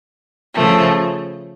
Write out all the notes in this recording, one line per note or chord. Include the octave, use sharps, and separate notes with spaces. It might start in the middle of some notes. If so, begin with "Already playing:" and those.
C#3 F3 A3